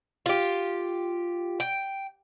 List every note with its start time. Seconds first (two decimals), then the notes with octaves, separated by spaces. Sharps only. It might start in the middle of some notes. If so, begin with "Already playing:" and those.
0.26 F4 G4
1.60 G5